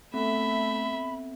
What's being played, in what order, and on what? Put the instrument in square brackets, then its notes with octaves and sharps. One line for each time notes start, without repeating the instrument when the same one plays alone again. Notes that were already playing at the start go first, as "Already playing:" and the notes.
[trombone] A3 [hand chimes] B3 C4 A4 [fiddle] E5 [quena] B5